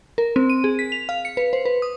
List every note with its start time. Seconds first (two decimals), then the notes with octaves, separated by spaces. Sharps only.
0.18 A#4
0.36 C4
0.50 D#7
0.64 G#4
0.79 B6
0.92 F7
1.09 F5
1.25 C#7
1.37 B4
1.53 C5
1.65 B4
1.82 D#6